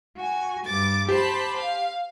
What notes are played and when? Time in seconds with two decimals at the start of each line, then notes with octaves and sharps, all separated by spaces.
0.17 F#4 G#5
0.64 G2 D6 A6
1.09 G4 C5 A5 B5
1.56 F5